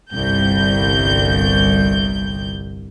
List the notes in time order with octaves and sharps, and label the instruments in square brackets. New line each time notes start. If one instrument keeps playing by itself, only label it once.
[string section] G1 C2 G6